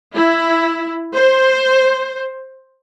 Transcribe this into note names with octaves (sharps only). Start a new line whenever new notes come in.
E4
C5